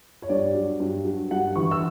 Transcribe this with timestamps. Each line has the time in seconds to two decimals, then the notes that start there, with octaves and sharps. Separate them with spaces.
0.22 C#5
0.29 G2 D5
0.54 F#3
0.80 G2
1.04 F#3
1.31 G2 F#5
1.56 E3 C#6
1.71 E6